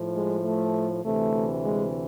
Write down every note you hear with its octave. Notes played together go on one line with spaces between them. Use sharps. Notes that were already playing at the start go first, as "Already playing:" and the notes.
Already playing: A2 F3
G#3
A3
D2 C3 E3 A3
G#3